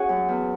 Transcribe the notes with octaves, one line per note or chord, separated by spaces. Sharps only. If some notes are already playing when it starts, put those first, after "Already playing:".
Already playing: C#4 F#4 G#4
F#2
E2